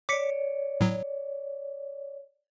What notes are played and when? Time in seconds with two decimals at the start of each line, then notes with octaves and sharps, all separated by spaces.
0.09 C#5 D5 D6 B6 C#7
0.81 A2 F#3